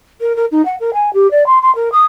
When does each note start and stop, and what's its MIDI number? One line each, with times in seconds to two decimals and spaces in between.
0.20 0.34 70
0.36 0.45 70
0.51 0.64 63
0.65 0.75 78
0.80 0.93 70
0.93 1.12 80
1.13 1.30 67
1.30 1.46 74
1.46 1.58 84
1.61 1.73 84
1.75 1.89 70
1.91 2.04 87